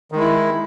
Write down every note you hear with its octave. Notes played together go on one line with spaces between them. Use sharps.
D#3 G#3 E4